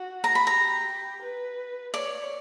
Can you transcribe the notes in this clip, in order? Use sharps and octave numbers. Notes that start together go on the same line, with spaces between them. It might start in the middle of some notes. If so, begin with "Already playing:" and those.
Already playing: F#4
A#5
B5
G4 A#5
B4
C#5 D5